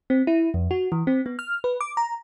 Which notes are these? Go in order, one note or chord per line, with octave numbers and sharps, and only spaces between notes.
C4
E4
F2
F#4
E3
C4
B3
F6
B4
D6
A#5